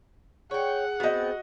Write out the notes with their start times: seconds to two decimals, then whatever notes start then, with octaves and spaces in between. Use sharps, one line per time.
0.51 G#4 C#5 F#5 G5
1.00 B3 C4 F#4 D#5